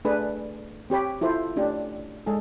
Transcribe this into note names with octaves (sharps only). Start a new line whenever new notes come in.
A3 D4 G#4 B4
C4 G4 C#5 B5
E4 F4 A4 C5
A3 C#4 D4 G4
G#3 G#4 A4